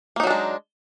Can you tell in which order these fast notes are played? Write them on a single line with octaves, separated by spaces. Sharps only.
A#3 D#4 F#3 D4 G#3